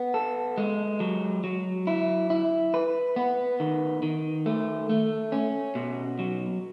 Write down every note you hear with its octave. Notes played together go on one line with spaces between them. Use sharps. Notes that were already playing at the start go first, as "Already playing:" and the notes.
Already playing: B3
A4
G#3
F#3
F#3
E4
E4
B4
B3
D#3
D#3
A3
A3
C#4
B2
F#3